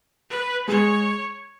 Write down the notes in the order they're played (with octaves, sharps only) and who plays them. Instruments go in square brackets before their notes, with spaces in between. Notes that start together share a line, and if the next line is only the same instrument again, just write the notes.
[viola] B4
[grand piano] G#3 G#4 [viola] C#5